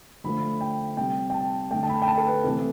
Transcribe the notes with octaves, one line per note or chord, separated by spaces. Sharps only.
D3 F3 A3 B5
G5
C3 G3 G5
G5
A5
D3 A3 G5
A5
B5
G5
A5
A4
B4
C3 E3 A3 A4